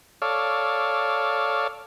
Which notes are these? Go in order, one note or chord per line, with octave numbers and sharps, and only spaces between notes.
A4 C#5 D5 F5